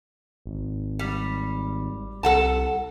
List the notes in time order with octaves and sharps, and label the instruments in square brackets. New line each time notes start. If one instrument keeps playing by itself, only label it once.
[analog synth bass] G#1
[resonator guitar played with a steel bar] G3
[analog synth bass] C2 [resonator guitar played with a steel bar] A4 F#5 A5